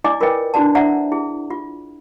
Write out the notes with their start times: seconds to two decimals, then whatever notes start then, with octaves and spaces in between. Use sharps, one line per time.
0.04 E4 D5 D#5 G#5 D6
0.20 F4 A#4 B4 C#5 D#5 G5
0.54 D4 E4 F#4 D5 A5
0.75 C5 D5 E5 F#5 A#5
1.12 E4 G#4
1.50 F4